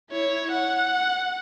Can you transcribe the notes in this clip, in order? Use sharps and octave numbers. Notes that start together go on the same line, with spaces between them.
E4 C#5
F#5